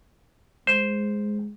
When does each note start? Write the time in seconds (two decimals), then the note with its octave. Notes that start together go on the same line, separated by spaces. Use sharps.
0.67 G#3 C5